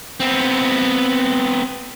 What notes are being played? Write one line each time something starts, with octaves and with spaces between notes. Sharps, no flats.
B3 C4